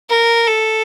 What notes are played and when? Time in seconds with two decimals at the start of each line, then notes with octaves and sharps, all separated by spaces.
0.10 A#4
0.47 A4